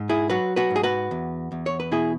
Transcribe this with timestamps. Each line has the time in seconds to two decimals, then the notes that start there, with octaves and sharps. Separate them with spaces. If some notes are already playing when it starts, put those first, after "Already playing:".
Already playing: G#2
0.09 E4 G#4
0.30 F#3 F#4 B4
0.56 F#4 B4
0.70 G#2
0.76 G#4
0.83 F#4 B4
1.11 E2
1.52 E2
1.66 C#5
1.80 B4
1.92 B2 E4 G#4